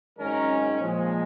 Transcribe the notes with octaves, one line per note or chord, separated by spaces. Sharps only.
G#1 F#2 D#3 G#3 C#4 A#4
A#2 F3 G#3